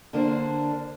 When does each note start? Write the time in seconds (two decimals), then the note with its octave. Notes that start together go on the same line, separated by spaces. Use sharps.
0.13 D3 A#3 D4 C5